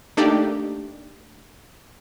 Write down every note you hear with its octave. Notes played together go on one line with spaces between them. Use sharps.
A3 A#3 D4 D#4 G4 D5